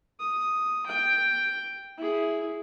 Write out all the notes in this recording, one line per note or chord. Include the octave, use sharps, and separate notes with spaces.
D#6
G5
E4 G#4